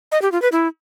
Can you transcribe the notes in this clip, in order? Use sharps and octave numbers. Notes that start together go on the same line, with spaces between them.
D#5
G4
F4
B4
E4